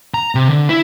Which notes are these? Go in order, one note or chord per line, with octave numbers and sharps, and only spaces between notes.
A#5
C3
D3
E4